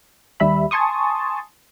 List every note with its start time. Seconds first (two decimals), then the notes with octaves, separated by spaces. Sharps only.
0.40 D#2 G3 E5 B5
0.71 G#5 A5 C6 C#6 D#6